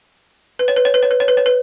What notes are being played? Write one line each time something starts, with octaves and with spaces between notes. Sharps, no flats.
B4
C#5
B4
C#5
B4
C#5
B4
C#5
B4
C#5
B4